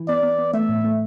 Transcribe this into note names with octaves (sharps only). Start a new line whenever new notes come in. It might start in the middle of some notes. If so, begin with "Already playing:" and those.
Already playing: E3
B3 D5
B3
B3
A3 E5
A2
A3